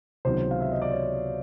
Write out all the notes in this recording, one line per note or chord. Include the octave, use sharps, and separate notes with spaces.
C#2 C3 D#3 F#3 B3 C5
F5
E5
D#5
D5
C#5